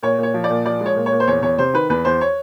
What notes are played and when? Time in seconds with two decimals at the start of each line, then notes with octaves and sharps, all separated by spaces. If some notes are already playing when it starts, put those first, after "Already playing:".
0.03 A#2 C#5
0.18 A#2
0.23 C#5
0.34 F3
0.44 D5
0.50 A#2
0.65 F3 D5
0.81 G#3
0.86 C#5
0.96 A#2
1.06 C#5
1.12 A#2
1.20 C5
1.27 E2 C#5
1.42 E2 C#5
1.58 C3 C5
1.74 D#3 B4
1.90 E2 B4
2.05 E2 C5
2.21 C#5